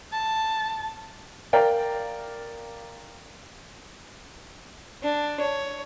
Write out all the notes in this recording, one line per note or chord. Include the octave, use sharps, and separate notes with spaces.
A5
A#4 D5 F5 G5
D4
C#5